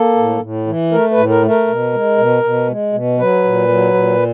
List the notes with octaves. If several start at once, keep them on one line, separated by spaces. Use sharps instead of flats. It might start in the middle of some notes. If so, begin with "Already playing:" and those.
Already playing: A#3 A4
A2
A2
E3
A3 A#4
B4
A2
A#4
A3
A#4
B2
G#3
B2
B2
G#3
B2
F#3 B4
A#2
F#3
A#2